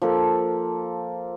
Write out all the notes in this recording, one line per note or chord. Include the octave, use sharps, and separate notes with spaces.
F3 A#3 A4